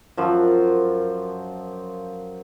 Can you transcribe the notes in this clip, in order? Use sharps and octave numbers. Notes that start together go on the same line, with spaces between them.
F#2 F3